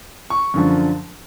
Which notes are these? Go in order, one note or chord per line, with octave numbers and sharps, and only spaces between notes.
C#6
F#2 D3 F3